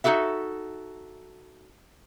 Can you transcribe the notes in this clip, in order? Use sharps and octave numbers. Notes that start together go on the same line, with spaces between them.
D#4 F4 F#4 A4 E5